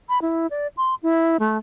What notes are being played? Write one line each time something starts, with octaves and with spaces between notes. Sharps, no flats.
B5
E4
D5
C6
E4
A3